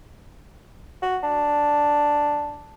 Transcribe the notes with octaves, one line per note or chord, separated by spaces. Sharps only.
F#4
D4